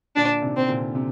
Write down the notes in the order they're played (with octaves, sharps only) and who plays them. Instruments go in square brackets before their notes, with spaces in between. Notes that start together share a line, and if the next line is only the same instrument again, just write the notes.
[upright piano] A#2 D3 [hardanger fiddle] D4
[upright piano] C3 D#3
[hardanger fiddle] C4
[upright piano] A#2 D3
C3 D#3